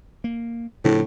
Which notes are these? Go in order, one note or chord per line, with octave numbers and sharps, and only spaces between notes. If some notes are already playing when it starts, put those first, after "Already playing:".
A#3
A2 C#3 F3 D4